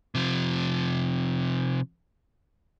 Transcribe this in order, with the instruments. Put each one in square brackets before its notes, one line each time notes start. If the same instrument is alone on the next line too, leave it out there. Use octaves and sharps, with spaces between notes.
[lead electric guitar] C3 F3